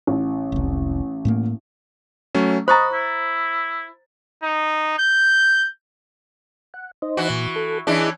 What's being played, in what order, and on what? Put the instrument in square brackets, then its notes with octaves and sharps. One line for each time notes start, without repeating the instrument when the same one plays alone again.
[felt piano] A1
[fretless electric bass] F1 C2
A2 A3 A#3
[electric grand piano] F#3 A3 C#4
[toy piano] C5 A#5 [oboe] D#5 [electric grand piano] B5 C#6 A6
[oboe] E4
[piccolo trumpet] D#4
G6
[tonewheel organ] F#5
D#4 C5 D#5
[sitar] E3 F#4
[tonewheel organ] A#2
A4
[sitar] E3 C#4 D4 [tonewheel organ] E4 G#4 D#5